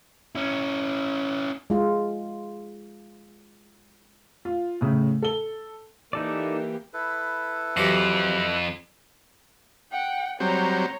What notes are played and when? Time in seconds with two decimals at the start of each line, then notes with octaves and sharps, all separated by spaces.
0.35 C#4 E4
1.70 G#3 F4
4.45 F4
4.81 A2 C#3
5.22 A4 G7
6.13 E3 A#3 D#4 G4 A4 D5
6.93 E4 A4 B4
7.77 F2 E3 F#3 G4
9.91 F#5 G5
10.40 F#3 G3 C4 C#5 A#5